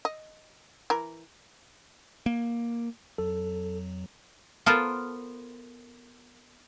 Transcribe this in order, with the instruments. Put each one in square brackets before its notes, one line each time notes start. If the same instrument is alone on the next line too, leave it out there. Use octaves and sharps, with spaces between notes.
[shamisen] D#5
E3 A#4
[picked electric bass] A#3
[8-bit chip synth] F2 F#3 [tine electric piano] A4
[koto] B3 F4 A4 A#4 C5